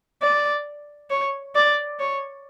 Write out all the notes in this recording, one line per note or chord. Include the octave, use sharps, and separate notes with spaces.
D5
C#5
D5
C#5